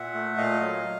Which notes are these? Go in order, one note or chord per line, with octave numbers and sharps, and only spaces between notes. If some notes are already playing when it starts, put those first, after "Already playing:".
Already playing: A#2 E5 F#5
A3
A#2 D#5 F5
F#3